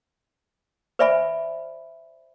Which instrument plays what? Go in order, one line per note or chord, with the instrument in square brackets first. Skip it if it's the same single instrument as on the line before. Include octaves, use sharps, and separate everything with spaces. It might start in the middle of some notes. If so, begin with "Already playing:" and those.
[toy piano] B4 C5 D5 E5 G#5 B5